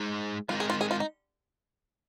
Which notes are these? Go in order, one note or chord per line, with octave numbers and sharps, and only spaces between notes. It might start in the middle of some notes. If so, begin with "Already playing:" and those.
Already playing: G#3 D#4 G#4 C5
G#3 C4 D#4 F4 A#4
G#4
F4
G#4
F4
D#4